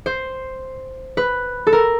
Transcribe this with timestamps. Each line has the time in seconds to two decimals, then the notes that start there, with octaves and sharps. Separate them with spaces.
0.06 C5
1.17 B4
1.67 A4
1.73 A#4